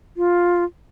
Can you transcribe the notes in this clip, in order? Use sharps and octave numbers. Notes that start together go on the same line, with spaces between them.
F4